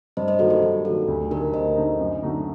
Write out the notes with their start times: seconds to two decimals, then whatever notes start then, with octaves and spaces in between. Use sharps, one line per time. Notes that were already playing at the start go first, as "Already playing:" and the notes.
0.17 G2 C5 D#5
0.28 C5 D#5
0.39 D#3 F#3 A#3 F#4 A4
0.50 G4
0.62 G2 G4
0.85 D#3 F#3 A#3 F#4 A4
1.08 D2
1.31 D3 A3 D#4 G4 A#4
1.53 D2 C5 D#5
1.76 D3 A3 D#4
1.99 F#2
2.22 D3 A3 D#4 F#4